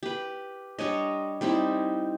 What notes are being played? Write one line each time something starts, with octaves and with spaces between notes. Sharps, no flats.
G4 B4
G3 D4 C#5 D#5
G3 C4 D#4 E4